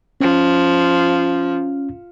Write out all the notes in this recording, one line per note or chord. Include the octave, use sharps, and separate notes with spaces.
F3 C#4